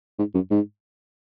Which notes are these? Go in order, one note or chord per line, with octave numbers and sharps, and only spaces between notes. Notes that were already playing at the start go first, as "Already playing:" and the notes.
G#2
F#2
G#2